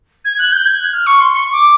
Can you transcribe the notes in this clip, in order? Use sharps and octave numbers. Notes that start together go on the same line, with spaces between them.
G#6
F#6
G6
G#6
F#6
F6
C#6
C6
C#6
D6